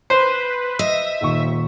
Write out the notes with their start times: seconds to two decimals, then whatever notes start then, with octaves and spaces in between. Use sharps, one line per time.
0.10 B4 C5
0.79 D#5 E5
1.21 D#1 D#2 C#6